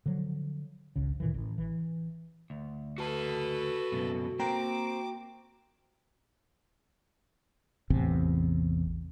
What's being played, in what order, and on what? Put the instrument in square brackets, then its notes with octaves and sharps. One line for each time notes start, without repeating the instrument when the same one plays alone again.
[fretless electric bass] D3 F3 F#3
G#1 C#2 C#3
A#2 D#3 E3
A1
E3
[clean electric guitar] D2
[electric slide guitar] F#4 A5 [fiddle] A4 B4
[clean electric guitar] C#2 F#2 B2
[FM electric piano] A#3 G5 A#5 [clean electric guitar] C4 [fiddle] D6
[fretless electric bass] A1 E2 C3